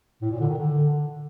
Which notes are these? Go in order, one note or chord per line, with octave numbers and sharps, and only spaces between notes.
A2
A#2
D3
D#3
D3